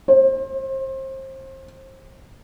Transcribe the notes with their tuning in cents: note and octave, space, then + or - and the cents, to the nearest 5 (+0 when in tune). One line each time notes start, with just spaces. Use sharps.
C5 +30